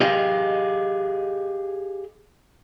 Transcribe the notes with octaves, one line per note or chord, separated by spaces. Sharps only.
G4 G#4 D#5 F5